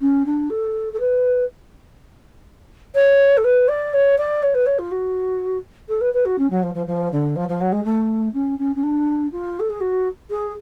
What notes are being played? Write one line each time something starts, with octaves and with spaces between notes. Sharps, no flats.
C#4
D4
A4
A4
B4
C#5
A4
B4
D5
C#5
D5
C#5
B4
C#5
F4
F#4
A4
B4
B4
F#4
C#4
F#3
F3
F3
F3
D3
F3
F3
F#3
G#3
A3
C#4
C#4
C#4
D4
F4
A4
G#4
F#4
G#4